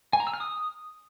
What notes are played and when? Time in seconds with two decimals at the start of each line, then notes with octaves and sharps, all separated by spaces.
0.13 G#5
0.20 A#5
0.27 E6
0.34 F6
0.40 D#6